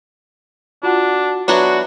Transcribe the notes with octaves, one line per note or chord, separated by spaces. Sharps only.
D4 F4 F#4 F#5
F#3 B3 D4 F#4 B4 E5